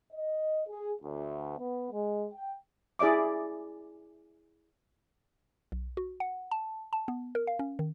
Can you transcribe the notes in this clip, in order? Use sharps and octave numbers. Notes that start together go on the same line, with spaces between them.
D#5
G#4
D2
B3
G#3
G5
E4 G#4 D5 E5 D6
B1
F#4
F#5
A5
A5
B3
A#4
F5
C#4
D#3